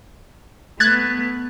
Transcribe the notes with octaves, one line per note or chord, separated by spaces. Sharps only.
A3 B3 F#6 G#6 A6